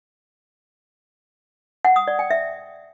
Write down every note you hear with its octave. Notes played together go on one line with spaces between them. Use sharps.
F#5
D#6
D5
G5
E5